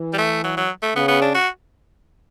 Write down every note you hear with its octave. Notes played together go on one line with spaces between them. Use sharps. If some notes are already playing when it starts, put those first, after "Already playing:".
Already playing: E3
G3
A3
F#3
F#3
A3
C#3 B3
B3
D4
F#4